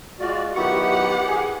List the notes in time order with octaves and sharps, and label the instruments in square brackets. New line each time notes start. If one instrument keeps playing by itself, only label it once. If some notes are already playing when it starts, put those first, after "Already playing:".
[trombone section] G#3 F4 [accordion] F#4 D5
[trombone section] D#3 F#3 B3 [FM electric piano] E4 F#4 C#6 [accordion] G4 [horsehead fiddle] F#5
[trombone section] G#4